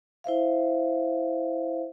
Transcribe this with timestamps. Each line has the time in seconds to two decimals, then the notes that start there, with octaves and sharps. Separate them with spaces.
0.24 E4 C5 E5 F5